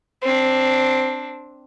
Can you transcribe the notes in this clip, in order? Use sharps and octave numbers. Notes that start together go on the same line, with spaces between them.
C4 D4